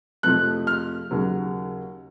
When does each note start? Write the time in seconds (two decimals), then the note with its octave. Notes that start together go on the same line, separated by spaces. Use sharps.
0.23 F2 C3 F3 A3 F#6
0.67 F6
1.11 D#2 C#3 F#3